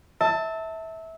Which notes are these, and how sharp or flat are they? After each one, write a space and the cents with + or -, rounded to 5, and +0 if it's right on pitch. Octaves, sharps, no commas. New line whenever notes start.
E5 -20 A5 +20